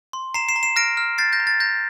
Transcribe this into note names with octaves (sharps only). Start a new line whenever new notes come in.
C6
A#5 C7 E7
C7 E7
A#5
C7 E7
F6 A#6 D7
F6
G6 A6 C7
G6 A#6
A#5
A6
A#5 G6 A#6